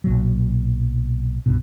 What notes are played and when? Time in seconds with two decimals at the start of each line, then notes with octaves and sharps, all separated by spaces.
0.04 B1 A#2 F#3
1.46 C2 G2 B2